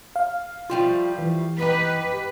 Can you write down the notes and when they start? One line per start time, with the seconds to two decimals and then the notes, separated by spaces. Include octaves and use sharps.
0.16 F5
0.70 F3 G3 A3 F4
1.18 E3
1.59 B3 D#4 G4 B4